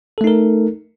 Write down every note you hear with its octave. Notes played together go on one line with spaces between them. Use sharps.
A3 D#4 A4 A#4